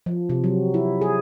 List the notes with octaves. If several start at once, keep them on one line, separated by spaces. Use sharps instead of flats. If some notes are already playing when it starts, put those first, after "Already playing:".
F3
C3
F#3
E4
G#4